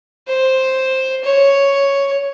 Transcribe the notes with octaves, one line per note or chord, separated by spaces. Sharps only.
C5
C#5